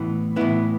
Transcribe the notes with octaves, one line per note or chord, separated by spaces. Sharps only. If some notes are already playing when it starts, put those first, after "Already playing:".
Already playing: A2 E3 B3
A2 E3 B3 E4